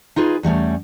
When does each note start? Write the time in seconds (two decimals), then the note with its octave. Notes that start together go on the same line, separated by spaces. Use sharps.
0.16 D#4 F4 G#4 B4
0.43 E2 G3 A3 C#4